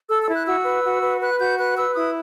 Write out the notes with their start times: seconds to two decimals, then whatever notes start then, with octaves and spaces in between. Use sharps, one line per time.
0.09 A4 E6
0.22 E6
0.28 E4
0.34 F#6
0.46 F#4 E6
0.65 B4
0.84 F#4
1.02 B4
1.21 B4 F#6
1.40 F#4 G6
1.58 B4 F#6
1.77 B4 E6
1.95 E4 D#6